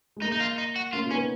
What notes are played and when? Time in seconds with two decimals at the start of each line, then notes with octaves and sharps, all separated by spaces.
0.17 G#3
0.22 A#3 D#4
0.32 D#4
0.40 F4
0.58 D#4
0.76 F#4
0.93 A#3 C#4 F4
1.06 F4
1.11 B3 C#4 D#4